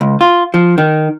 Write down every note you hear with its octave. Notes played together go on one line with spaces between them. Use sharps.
C#2
F4
F3
D#3